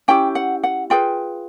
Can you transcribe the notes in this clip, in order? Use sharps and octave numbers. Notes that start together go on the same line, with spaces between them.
C#4 E4 G4 G5
F#5
F#5
F4 G#4 B4 G5